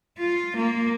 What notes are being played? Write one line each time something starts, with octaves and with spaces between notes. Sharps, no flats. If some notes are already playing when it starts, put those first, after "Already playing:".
F4
A#3